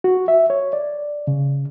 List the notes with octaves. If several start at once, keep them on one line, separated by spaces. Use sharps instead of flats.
F#4
E5
C#5
D5
C#3